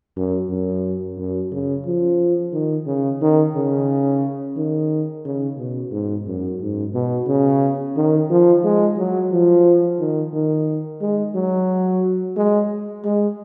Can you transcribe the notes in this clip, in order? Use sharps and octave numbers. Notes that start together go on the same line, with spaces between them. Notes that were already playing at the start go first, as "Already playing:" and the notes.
F#2
F#2
F#2
C#3
F3
D#3
C#3
D#3
C#3
D#3
C#3
B2
G#2
F#2
G#2
B2
C#3
D#3
F3
G#3
F#3
F3
D#3
D#3
G#3
F#3
G#3
G#3